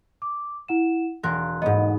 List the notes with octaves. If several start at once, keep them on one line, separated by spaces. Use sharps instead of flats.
D6
E4 F#5 E7
E1 A#4 C6 F#6
G#2 B3 D#5